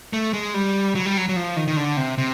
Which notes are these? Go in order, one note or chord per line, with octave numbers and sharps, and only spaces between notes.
A3
G#3
G3
F#3
G3
F#3
F#3
F3
D#3
D#3
D3
C3
C3